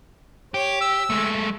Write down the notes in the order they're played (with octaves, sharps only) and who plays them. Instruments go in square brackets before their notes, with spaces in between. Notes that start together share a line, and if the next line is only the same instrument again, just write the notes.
[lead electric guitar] G4 [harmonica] C#5
[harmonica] E6
[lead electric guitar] G#3 A3